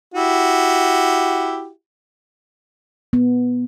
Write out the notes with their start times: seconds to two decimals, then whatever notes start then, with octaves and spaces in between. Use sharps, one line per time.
0.14 E4 F#4 G4
3.13 B3